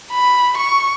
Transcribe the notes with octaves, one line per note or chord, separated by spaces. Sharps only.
B5
C#6